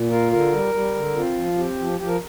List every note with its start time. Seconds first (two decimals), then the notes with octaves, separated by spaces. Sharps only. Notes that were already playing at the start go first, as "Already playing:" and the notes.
Already playing: A#2
0.11 F4 A#4
0.31 D3 A#4
0.53 G3
0.74 G3
0.95 D3
1.16 C4 F4
1.37 F3
1.58 C4 G4
1.79 F3
1.99 F3 G4
2.08 A#4